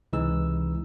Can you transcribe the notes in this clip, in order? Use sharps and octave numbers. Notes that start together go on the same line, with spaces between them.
C#2 C3 E3 G#3 D#4 E6